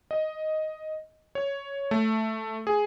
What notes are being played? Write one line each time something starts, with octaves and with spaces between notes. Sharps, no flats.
D#5
C#5
A3
G#4